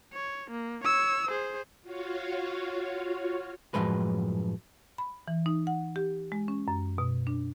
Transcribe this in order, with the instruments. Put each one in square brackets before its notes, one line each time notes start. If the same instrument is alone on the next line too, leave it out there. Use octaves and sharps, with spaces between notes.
[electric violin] C#5
A#3
C#5 E6
G#4 C5
[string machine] F4 F#4 C#5 F5
[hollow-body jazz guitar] F#2 A2 F3 G#3 B4
[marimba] B5
E3
D#4
F#5
G4
G#3
C#4
F#2
B2
D4